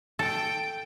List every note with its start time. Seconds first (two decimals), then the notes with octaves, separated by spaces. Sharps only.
0.19 A4 G5